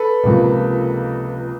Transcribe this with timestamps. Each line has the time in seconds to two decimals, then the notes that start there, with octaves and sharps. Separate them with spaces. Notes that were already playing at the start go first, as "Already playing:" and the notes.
Already playing: A4 B4
0.23 C#2 C3 F3 A#3